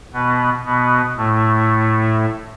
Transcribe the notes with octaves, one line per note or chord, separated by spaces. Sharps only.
B2 B3
B2 B3
A2 A3